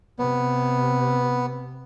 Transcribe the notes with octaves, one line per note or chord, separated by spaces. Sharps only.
C3 B3